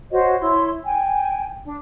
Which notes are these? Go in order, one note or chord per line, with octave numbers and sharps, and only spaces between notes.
F#4 C5 C#5 D#5
E4 C#5 C6
G5 G#5
D4